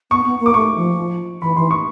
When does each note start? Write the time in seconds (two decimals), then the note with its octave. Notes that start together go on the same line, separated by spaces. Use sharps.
0.11 B3 C#6
0.25 B3
0.40 A#3
0.46 D6
0.54 A3 C#6
0.76 F3
1.42 E3 B5
1.56 E3 C6
1.71 C#6